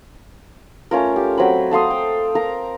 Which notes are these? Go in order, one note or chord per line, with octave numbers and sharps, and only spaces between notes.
A3 C#4 F4 A#4
G4
F#3 C4 B5
A4 F5 C6 D#6
G5
A#4 F5 A#5